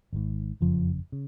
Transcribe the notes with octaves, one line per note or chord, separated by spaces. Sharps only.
G#1 G#2
F#1 F2 C#3 F3
C#3